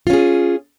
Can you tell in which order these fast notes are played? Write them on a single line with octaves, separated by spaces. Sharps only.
F4 C#4 G#4